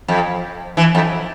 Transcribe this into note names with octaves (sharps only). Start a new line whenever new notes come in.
F2
E3
F2